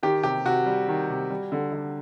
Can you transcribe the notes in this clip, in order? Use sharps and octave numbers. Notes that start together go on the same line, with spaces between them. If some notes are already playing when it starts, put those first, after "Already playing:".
D#3 G4
C3 G4
C3 F#4
G3
D#3
C3
G3
D3
D3